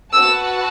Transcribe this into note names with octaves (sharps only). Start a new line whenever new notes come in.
F#4 B4 F#5 A5 E6